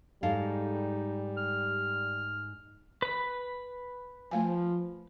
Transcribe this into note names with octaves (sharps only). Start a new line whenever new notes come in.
G#2 G3 D#4 A4 F5
F6
B4 B5
F3 A3 F5 G#5